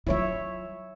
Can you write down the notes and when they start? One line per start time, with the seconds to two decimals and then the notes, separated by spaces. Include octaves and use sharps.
0.07 F#3 E4 F4 C#5 E5